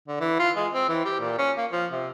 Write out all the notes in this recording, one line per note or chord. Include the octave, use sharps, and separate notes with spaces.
D3
E3
F4
G#3
C4
E3
G4
A#2
C#4
A#3
F3
C3